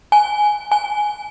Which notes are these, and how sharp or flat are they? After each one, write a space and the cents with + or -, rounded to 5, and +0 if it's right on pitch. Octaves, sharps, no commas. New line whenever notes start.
G#5 +10
G#5 +10